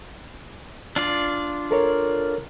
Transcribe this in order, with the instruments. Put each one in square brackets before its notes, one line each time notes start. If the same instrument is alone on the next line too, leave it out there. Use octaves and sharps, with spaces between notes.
[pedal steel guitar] D4 F4 D5
[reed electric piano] A4 A#4 C#5